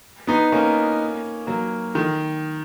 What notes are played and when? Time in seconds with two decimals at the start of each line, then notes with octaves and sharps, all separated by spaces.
0.27 B3 D#4
0.52 A#3 C#4
1.47 F#3 A#3
1.95 D#3